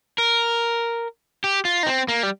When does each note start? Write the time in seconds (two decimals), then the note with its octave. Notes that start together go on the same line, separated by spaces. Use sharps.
0.18 A#4
1.44 G4
1.65 F4
1.83 D#4
1.86 C4
2.08 A#3
2.23 G3